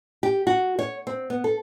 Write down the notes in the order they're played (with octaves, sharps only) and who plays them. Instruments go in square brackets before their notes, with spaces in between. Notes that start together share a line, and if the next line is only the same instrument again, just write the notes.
[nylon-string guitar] G4
F#4
C#5
C4
B3
A4